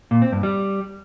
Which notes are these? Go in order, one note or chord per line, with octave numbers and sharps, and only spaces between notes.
A#2
C4
G2
G3